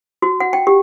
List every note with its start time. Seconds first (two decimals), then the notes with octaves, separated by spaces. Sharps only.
0.22 F#4
0.40 F#5
0.53 G5
0.67 G4